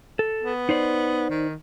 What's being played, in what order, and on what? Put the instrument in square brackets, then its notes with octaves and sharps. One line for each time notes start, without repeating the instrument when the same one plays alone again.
[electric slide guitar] A4
[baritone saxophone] B3
[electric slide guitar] D#4 C5 D5
[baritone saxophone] D#3